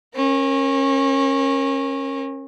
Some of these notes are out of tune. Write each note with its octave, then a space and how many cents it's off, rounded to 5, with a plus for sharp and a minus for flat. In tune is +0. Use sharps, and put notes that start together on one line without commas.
C#4 -30 A#4 +5